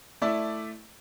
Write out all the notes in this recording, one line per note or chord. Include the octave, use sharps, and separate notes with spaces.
A3 E4 D5 E5